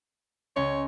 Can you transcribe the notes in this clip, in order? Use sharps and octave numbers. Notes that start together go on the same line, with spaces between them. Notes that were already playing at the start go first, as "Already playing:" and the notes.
C#2 C#4 C#5 C6